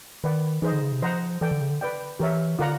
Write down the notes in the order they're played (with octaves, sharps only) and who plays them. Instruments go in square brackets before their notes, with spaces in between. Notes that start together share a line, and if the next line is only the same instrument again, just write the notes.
[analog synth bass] D#3 [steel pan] B4 D5 F#5
[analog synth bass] E3 [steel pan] D#4 G#4 C5 D#5
[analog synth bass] D3
C#3
C3
[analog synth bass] F3 [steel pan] C5 D#5 F#5 A#5
[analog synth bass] E3 [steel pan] A4 D5 G5
[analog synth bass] D3
C#3
D3
[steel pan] B4 D5 G5
[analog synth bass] E3 [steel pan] G4 A#4 C#5 E5
[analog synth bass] D3 [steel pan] F4 A#4 D5 F#5 A#5